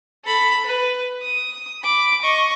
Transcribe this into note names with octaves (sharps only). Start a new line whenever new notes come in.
A4 B5
B4
D#6
B5 D6
D#5 C#6